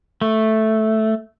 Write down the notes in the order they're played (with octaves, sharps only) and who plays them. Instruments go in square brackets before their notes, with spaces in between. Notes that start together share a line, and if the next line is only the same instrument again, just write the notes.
[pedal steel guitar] A3